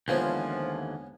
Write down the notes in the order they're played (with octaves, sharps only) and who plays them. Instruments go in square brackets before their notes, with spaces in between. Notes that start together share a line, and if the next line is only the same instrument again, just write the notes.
[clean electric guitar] D#2 D3 E3 [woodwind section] F3 [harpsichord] G#3 B3 C#4